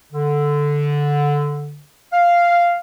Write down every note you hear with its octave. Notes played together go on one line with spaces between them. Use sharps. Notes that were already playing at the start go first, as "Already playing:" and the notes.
D3
F5